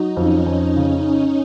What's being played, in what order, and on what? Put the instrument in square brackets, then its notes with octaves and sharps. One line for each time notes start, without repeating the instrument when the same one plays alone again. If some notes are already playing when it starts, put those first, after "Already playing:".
Already playing: [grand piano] F#3 [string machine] D#4
[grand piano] F2 [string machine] C#4
[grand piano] F2
C#3